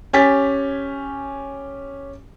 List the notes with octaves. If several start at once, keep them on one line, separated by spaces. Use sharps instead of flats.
C#4 G4 G#5 A6 B6